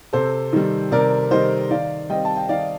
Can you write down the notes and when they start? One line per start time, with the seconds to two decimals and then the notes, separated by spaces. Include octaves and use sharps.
0.13 C3 A4 C5
0.53 D#3 G3
0.92 C3 A#4 D5
1.31 D#3 G3 C5 D#5
1.71 D#3 D5 F5
2.09 G3 C4 D#5 G5
2.25 A5
2.37 G5
2.49 D#3 D5 F5